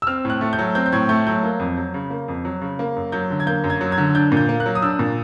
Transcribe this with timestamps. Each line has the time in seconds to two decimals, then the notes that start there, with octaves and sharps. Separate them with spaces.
0.02 E6
0.07 C4 F6
0.25 A2
0.30 F#6
0.41 A3
0.53 G6
0.59 F#3
0.75 C4 G6
0.86 G6
0.92 A2 G#6
1.09 A3 G6
1.27 F#3 G6
1.43 A#3
1.60 F2
1.77 F#3
1.94 C#3
2.10 A#3
2.28 F2
2.45 F#3
2.62 C#3
2.79 A#3
2.96 F#2
3.12 F#3 G6
3.30 D3
3.40 G#6
3.47 A#3 G6
3.64 F#2
3.70 G#6
3.81 F#3
3.92 G#6
3.98 D3
4.15 D4 G6
4.32 A#2
4.37 G6
4.49 A#3
4.60 F#6
4.66 F#3
4.75 D#6
4.82 D4 E6
4.99 A#2